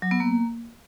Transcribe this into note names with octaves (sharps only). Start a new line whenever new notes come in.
F#3
B3
A#3